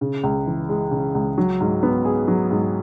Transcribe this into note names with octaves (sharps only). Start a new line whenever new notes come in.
C#3
C#2
E3
G#3
C#3
C#2
F#3
G#2
B3
G#4
F#3
G#2